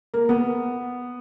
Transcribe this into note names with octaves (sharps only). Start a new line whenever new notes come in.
A#3
B3